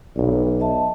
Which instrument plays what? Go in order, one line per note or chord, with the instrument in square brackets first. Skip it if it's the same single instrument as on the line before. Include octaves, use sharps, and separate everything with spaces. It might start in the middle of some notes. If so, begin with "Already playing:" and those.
[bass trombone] B1 [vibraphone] D5
[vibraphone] D#5 E5 A5